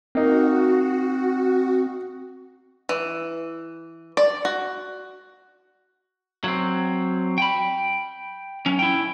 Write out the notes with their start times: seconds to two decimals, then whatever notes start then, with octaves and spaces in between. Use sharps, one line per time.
0.15 A#3 C4 D#4 F#4
2.89 E3
4.17 D5
4.45 F#4
6.44 F#3 C4
7.38 G5 B5
8.66 F#3 C#4
8.79 E4 G5